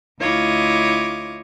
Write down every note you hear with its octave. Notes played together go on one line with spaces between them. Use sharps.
D2 E4 F4 C#5 D#5 D6